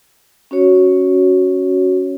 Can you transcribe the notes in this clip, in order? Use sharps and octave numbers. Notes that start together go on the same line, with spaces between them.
C#4 F#4 C#5